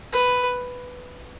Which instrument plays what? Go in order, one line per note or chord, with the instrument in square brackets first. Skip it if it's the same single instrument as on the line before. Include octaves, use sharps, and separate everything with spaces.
[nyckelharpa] B4